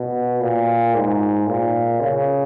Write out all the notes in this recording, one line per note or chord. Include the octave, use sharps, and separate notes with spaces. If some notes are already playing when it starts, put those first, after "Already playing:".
Already playing: B2
A#2
G#2
A#2
C#3